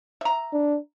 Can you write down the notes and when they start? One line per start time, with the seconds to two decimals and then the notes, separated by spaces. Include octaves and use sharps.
0.21 E5 A#5
0.53 D4